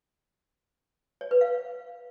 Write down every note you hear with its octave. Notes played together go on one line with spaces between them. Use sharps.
C#5
B4
F5